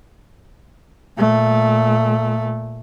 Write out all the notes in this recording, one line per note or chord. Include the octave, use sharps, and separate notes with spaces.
A#2 A3